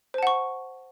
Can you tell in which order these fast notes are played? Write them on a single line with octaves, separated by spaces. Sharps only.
C5 A5 F#5 C#6